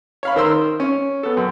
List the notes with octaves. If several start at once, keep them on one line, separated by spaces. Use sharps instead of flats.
C#5 F5 B5
D#3 A#4 C5 C6 E6
C#4
B3 A4
F#2